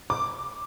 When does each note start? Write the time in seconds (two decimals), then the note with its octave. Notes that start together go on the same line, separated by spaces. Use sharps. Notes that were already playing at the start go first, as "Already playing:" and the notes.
0.10 D6